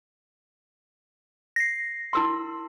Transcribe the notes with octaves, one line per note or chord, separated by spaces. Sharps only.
A#6 C7
E4 A#4 C6